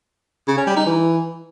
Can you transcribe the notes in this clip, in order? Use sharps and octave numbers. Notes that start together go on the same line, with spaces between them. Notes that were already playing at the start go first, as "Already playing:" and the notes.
C#3
C#4
G3
D#4
E3